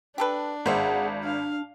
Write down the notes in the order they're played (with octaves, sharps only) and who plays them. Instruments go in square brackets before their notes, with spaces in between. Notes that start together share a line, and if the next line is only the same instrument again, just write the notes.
[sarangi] D4 [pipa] G4 A4 B4
[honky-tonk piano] G#1 [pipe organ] G#4 F#5 [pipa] A#4 C5 E5
[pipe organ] D4 [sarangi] F5